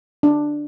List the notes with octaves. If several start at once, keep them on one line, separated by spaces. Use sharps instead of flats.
D4